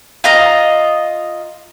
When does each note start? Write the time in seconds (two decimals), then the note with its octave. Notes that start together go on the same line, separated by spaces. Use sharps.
0.24 F4 D#5 A#5